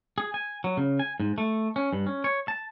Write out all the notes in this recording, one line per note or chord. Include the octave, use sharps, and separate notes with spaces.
G#4
G#5
F#3
C#3
G#5
G#2
A3
C#4
G2
C#4
C#5
A5